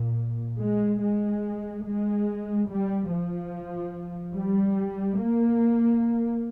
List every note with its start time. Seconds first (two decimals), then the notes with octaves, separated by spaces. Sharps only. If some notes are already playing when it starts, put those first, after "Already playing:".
Already playing: A#2
0.59 G#3
1.01 G#3
1.84 G#3
2.68 G3
3.09 F3
4.34 G3
5.19 A#3